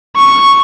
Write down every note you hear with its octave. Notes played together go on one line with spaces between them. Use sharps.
C#6